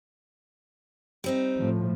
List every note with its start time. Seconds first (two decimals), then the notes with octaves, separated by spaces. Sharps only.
1.24 G3 C4 D#4
1.59 A2 F3